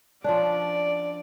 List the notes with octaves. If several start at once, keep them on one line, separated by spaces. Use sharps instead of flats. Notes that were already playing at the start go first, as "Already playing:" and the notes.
F3 C#4 D4 D5